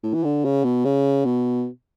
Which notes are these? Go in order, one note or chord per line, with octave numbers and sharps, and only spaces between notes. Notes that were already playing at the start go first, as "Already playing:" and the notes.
A2
E3
D3
C#3
B2
C#3
B2